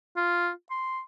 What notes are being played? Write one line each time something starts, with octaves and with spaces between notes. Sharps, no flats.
F4
C6